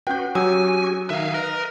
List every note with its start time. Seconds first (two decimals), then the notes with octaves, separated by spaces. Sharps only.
0.07 C#4 F#4 B4 F#5 G5 G6
0.35 F#3 C#4 F#4 G4 G#5 D#6 E6
1.10 D#3 D#4 E5 F5 G#5
1.34 A#4 B4 D#5